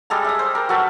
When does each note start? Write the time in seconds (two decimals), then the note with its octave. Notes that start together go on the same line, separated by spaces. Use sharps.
0.10 G3 G#3 A4 A#5
0.24 E5 D#6
0.39 C5
0.55 A#4
0.69 F#3 A4 B4